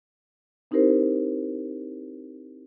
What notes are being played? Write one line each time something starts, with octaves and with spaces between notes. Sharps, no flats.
C4 D#4 E4 G4 A#4 C5